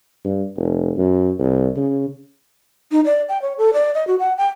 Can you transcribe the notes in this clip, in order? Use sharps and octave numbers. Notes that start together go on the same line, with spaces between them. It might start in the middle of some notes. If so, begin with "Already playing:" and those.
G2
F1
F#2
C2
C#3
D#4
D5
G5
C#5
A4
D5
D#5
F#4
F#5
G5